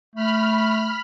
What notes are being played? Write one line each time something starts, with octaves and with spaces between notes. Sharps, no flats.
A3 B5 F6